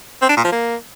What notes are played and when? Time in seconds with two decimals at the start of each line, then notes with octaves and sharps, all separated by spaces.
0.22 C4
0.29 D4
0.37 A#2
0.44 F3
0.52 A#3